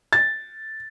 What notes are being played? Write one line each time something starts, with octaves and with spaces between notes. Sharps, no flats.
A6